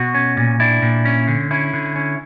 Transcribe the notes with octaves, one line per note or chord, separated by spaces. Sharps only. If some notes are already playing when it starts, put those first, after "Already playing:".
Already playing: B2 F#4
C#4
A#2
D4 E4
A#2
C#4
D3
C#4 E4
D3
C#4